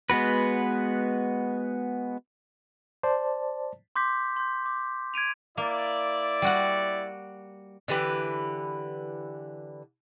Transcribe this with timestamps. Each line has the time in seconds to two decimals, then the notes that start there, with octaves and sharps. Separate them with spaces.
0.10 G#3 B3 F#4 B4
3.03 C5 D5 A5
3.96 C6 D6 G6 B6
4.36 C6 G6
4.66 D6
5.14 G#6 D7 D#7 F7
5.58 A#3 E4 D5
6.42 G3 F#4 F#5
7.88 D3 E3 G4 B4